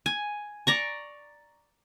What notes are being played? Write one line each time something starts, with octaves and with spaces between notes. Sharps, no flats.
G#5
D5 A#5 C#6